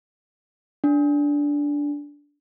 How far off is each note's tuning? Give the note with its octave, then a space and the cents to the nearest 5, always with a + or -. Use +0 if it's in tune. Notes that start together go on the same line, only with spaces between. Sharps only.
D4 -15